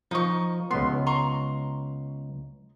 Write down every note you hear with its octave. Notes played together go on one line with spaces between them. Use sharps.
F3 D#4 C#6
C#2 B3 C6
A#5 C6 C#6